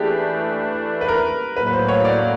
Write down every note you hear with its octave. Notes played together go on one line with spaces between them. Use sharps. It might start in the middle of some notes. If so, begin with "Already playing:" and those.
Already playing: E3 A3 D4 G4 G#4
B4
A#4
A2 F#3 A#3 B4
B4
C5
C#5
D5